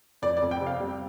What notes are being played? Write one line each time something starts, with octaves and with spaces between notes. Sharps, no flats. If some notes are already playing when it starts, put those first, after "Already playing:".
F2 D5
D5
F2
G5
C3
F5
G3